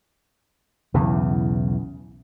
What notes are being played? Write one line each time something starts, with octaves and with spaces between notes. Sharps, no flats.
B1 E2 C#3 E3